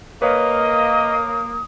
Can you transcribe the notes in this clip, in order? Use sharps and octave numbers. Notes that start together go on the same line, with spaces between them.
A#3 B4 C#5 D#5 F5 D#6